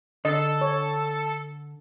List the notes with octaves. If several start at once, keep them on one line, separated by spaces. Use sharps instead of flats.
D3 A4 D#5
C#5